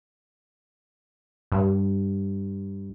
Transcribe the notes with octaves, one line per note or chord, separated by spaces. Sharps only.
G2